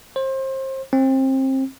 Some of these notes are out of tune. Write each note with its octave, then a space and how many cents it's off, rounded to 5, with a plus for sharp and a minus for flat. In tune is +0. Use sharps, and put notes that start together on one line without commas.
C5 +30
C4 +25